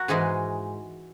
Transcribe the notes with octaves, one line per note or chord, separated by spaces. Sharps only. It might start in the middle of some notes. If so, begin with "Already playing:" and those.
Already playing: F#4 A#4
G#2 E3 G#3 D#4 G#4